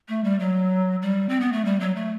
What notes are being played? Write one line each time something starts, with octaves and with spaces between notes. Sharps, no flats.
A3
G3
F#3
G3
C4
B3
A3
G3
F#3
A3